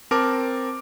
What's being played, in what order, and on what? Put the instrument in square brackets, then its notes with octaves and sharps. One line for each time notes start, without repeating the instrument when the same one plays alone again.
[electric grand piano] C4 A#4 A5 D6